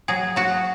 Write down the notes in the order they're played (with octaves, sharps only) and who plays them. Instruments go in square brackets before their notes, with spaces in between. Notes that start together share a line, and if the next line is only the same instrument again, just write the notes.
[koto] F#3 G#4
F#3 F#4